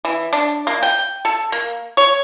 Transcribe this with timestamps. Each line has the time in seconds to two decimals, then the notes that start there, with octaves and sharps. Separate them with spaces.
0.05 E3
0.33 D4
0.67 A#3
0.83 G5
1.25 A4
1.52 A#3
1.97 C#5